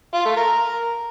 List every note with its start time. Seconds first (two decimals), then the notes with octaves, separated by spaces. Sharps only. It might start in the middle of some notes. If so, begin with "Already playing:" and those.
0.14 F4
0.25 A3
0.37 A#4